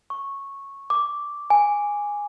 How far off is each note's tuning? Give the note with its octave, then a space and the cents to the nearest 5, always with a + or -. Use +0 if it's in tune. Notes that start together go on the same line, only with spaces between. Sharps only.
C#6 -10
D6 -5
G#5 -10